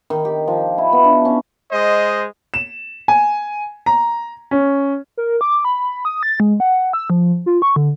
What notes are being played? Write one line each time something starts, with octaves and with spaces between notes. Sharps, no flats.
D#3
G4
F3
E4
B3
D4
C#4
G#3 C5 D#5
E7
G#5
A#5
C#4
A#4
D6
B5
D#6
A6
G#3
F#5
E6
F3
F4
C#6
D3